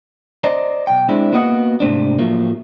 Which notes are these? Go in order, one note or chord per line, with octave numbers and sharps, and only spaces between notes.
C5 D5 D#5 A#5
B1 G5
G#3 C4 D4 E4
A#3 B3 F#4 D#5 F#5
G#2 C3 A3 C4 D4
A2 F3 F#3 A3 A#3